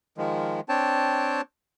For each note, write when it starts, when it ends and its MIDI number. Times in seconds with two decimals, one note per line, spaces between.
0.18 0.61 51
0.18 0.61 53
0.18 0.61 56
0.69 1.41 60
0.69 1.41 62
0.69 1.41 73
0.69 1.41 79
0.69 1.41 81